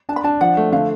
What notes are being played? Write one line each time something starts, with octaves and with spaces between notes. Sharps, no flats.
D4 A5
B5
D4 A5
F3 F#5
A3
D3 F5